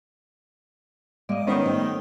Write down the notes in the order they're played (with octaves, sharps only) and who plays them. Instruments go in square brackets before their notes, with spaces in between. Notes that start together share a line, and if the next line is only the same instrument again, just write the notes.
[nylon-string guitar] G3 G#3 A#3 [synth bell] D5 D#5
[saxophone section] D#3 [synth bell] B3 C#4 C5 [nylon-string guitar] G4 E5 F#5
[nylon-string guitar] G3 A3